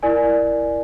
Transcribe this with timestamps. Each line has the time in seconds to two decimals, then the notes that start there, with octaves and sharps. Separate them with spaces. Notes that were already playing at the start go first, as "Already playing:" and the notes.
0.03 E4 A#4 D5 G#5